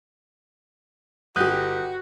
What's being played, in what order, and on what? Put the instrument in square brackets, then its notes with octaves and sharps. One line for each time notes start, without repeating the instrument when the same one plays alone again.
[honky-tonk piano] G1 G4 [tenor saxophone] F#4 [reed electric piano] D#6 F#6 G6